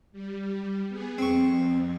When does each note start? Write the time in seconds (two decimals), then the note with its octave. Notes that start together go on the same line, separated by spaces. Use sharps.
0.12 G3
0.89 B3 G#4
1.18 F2 C4 C#6